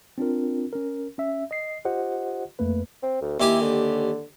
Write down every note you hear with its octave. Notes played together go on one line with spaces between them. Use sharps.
C4 D4 F4 A#4
C#4 A#4
C#4 E5
D#5 C7
F4 G4 C5 D#5 F#5
F2 A3 A#3 B4
C4
D2
D#2 E4 G4 G#5
D3